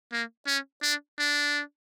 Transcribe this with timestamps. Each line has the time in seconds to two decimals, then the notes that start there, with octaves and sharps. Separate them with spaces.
0.12 A#3
0.47 C#4
0.83 D4
1.19 D4